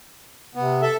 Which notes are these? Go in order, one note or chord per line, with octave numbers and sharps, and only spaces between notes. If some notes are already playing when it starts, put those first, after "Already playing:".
C3 B3
A4 E5